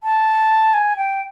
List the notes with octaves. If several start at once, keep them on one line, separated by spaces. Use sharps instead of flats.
A5
G#5
G5